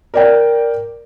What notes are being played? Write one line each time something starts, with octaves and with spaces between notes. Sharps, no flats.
A#4 D5 G5